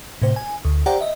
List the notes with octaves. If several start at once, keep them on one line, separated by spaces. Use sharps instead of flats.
A2 C3 C5
G#5
D2
G4 C5 D5 F#5 G5 A#5
D#5 E5